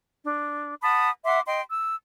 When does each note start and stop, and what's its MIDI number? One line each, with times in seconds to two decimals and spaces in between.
0.24 0.74 62
0.82 1.09 78
0.82 1.09 81
0.82 1.09 83
0.82 1.09 87
1.24 1.40 76
1.24 1.40 78
1.24 1.40 84
1.24 1.40 86
1.47 1.61 75
1.47 1.61 79
1.47 1.61 84
1.69 1.94 88